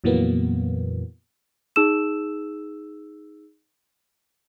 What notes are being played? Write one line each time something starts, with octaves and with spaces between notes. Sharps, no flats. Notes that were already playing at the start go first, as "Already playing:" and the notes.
F2 A#2 E3 F#3 A#3 B3
D#4 G#4 E6 E7